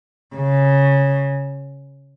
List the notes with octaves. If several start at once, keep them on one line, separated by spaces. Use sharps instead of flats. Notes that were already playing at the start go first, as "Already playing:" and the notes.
C#3